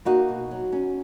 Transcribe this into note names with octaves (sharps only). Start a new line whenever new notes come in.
A#3 D#4 F#4
B2
F#3
C#4